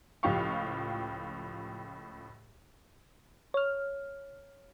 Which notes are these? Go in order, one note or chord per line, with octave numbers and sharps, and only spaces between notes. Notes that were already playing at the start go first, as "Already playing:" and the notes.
C#2 A2 F3 G4 F5 C#6
C#5 F6